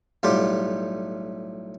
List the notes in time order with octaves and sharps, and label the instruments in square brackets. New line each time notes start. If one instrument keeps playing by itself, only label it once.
[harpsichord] B1 A2 G3 F4 G4